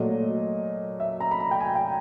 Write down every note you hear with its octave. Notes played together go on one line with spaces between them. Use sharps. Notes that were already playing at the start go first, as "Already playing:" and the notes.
Already playing: A#2 F#3 A3 D#5
E5
A#5
B5
A#5
G5
G#5
G5